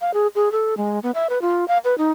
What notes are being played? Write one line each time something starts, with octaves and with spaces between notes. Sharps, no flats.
F5
G#4
G#4
A4
G#3
B3
E5
B4
F4
F5
B4
D#4